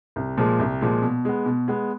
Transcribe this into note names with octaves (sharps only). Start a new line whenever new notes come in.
C2
A#2 F3 G#3
C2
A#2 F3 G#3
B2
G#3 B3
B2
G#3 B3